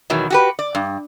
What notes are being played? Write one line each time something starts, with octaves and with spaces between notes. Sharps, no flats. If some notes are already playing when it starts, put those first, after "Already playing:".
E2 B2 D#3 F#3
F#4 G4 B4
D5
G2